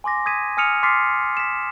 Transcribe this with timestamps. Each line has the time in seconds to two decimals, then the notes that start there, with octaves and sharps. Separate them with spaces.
0.04 G#5 C6 D6 A#6
0.26 D#6 G#6 B6 D#7
0.57 G#5 D#6 F6 C#7 D#7 F7
0.83 C6 D6 F6 A6 B6 C7
1.37 B6 E7